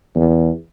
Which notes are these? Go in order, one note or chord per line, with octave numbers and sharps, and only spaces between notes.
E2